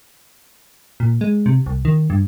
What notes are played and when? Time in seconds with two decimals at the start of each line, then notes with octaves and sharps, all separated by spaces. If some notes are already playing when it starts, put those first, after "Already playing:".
1.00 A#2
1.21 G#3
1.46 C3
1.66 C2
1.85 D#3
2.10 G2